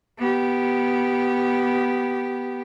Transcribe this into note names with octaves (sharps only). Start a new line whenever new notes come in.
B3 G4